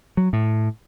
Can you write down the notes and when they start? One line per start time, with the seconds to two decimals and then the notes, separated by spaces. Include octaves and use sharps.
0.17 F#3
0.33 A2